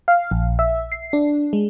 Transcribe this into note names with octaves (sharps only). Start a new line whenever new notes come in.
F5
A#1
E5
C7
D4
G#3